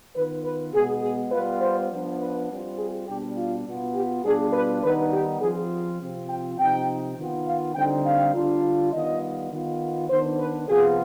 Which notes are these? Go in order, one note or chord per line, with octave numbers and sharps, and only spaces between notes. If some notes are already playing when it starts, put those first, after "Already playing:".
D#3 B3 F4 B4
B4
B2 G#3 B3 G#4
G#4
G3 B3 F4 B4
C5
F3 B3 D4
B4
G3 C4 F4
G#4
B2 G3 D4 G4
F4
B2 B3 F4
G4
B2 G3 D4 F4 G#4
B4
D#3 G3 B3 D#4 B4
G4
F3 C4 F4 G#4
C3 F3 C4 F4
G5
C3 F3 C4 D#4 G5
D#3 B3 F4
F5
D3 G3 C4 D#4 G5
F5
D3 G3 D4 F4
D#3 G3 B3 F4 D#5
D#3 B3 F4
D#3 B3 D4 C5
B4
C3 F3 B3 F4 G#4